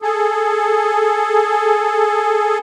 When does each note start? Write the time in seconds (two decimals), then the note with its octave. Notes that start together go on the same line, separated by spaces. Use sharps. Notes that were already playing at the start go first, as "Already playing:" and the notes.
0.02 G#4 A4